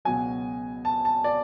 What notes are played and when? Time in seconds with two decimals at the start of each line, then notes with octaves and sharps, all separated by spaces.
0.05 C#2 B2 F#3 G#5
0.85 A5
1.05 A5
1.24 D5